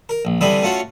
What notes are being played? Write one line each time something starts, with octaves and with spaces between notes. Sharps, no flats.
A#4
A#1
D3 E3 G3 C4 B5 D#6
A3 C#4 F4 F#4 C#5